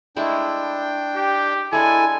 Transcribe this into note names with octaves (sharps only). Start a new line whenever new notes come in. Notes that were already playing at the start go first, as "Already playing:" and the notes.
G#3 A3 D4 E4 G5
G4
G#3 D4 E4 A4 G#5